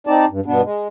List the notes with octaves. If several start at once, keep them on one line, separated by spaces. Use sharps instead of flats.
C4 D#4 D5 A5
G2
G2 B2 B3 D4
G#3